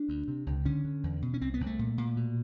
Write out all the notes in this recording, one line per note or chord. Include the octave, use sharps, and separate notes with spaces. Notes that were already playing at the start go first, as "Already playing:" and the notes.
Already playing: D4
D2
C3
C#2
D3 C#4
D3
E2
B2
C#4
C2 C4
B3
C2
A3
A#2
A#2
B2